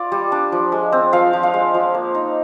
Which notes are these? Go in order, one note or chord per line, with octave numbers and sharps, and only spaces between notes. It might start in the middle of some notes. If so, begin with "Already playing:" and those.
Already playing: F4 D5
G3
D4
F3
G#3
C4
F3 F5
F3
F5
G#3
F3
A#3
D#4